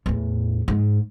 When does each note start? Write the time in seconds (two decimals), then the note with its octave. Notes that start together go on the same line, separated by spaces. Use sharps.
0.06 E2 A2
0.68 G#2